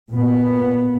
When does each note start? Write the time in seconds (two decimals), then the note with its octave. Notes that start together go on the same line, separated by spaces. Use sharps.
0.11 A#2 B3